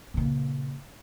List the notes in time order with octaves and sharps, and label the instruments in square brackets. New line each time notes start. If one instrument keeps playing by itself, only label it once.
[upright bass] A#2 C#3